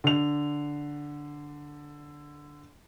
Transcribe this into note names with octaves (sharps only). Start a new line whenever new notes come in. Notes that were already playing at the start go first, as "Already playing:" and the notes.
D3 F7